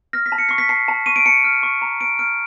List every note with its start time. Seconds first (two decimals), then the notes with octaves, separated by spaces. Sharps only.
0.13 F6 A#6
0.26 B6
0.32 A5
0.38 C#7
0.49 C#6 C7
0.58 B6
0.69 A5 C7
0.88 A5
1.06 C#6 D#7
1.16 D7
1.26 A5 C#7
1.44 F6
1.63 C#6
1.82 A#5
2.00 A#5 D7
2.19 F6 D7